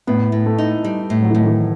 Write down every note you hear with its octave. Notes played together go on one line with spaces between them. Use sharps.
A2 B3
A2
A3
D#4
G3
A2
F#3
E3
A2 D#3
E3